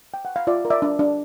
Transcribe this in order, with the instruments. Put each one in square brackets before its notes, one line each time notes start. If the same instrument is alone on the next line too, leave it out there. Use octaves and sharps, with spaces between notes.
[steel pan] G5
F#5
F5
F4 D5 E5
A#4
D5 E5
D4
D4